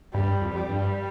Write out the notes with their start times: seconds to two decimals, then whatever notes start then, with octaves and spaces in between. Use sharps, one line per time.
0.14 G2 G3
0.42 F2
0.56 G3
0.69 G2